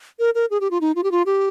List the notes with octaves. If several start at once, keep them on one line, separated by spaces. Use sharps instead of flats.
A#4
A#4
G#4
G4
F4
D#4
F4
G4
F4
G4